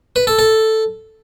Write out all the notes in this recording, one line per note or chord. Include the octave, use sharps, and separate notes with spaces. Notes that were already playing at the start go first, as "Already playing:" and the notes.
B4
A4
A4